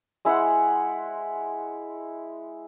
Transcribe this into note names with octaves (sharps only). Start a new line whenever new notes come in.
G#3 E4 C5 F#5